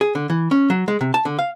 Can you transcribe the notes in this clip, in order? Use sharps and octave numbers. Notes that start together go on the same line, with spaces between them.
G#4
D3
E3
C#4
F#3
G#3
C3
A5
D3
F5